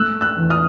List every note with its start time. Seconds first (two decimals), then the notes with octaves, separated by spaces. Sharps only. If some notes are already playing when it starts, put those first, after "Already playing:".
Already playing: A3 E6 F#6
0.21 E6 F#6
0.37 E2
0.50 D#6 F6